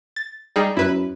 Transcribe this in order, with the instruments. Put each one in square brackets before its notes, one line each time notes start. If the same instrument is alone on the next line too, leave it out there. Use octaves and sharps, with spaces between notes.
[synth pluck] A6
G3 D#4 G#4
[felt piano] F#2 [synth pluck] E4 B4